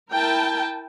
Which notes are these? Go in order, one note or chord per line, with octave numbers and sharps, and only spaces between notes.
E4 A#4 G5 A5